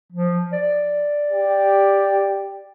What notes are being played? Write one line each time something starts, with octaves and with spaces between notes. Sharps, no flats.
F3
D5
G4